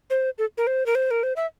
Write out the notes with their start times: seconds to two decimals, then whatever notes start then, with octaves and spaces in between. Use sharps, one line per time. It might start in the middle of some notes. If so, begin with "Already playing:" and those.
0.10 C5
0.38 A4
0.58 A#4
0.67 C5
0.86 A#4
0.95 C5
1.11 A#4
1.23 C5
1.36 E5